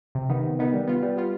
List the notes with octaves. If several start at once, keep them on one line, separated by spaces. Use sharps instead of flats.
C3
D#3 B3 D#4
C3
D#3 B3 D#4
G3
B3 F4
G3
B3 F4